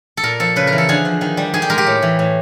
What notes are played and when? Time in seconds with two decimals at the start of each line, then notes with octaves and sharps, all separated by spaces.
0.17 A4
0.23 A#2 A#4
0.40 F3 A4
0.56 C#3 B4
0.67 A#4
0.72 E3
0.78 A4
0.89 D3 G#4
1.05 F3
1.21 D#3
1.37 G3
1.53 D#3 G#4
1.62 G4
1.70 G#3 A#4
1.78 G4
1.86 A2
2.02 E3
2.19 A2